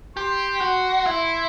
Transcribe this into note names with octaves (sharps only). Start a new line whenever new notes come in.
G4 C6
F#4
E4